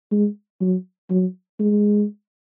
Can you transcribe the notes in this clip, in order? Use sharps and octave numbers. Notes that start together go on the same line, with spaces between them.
G#3
F#3
F#3
G#3